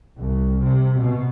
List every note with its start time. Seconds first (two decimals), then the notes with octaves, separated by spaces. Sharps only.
0.17 C2
0.60 C3
0.98 B2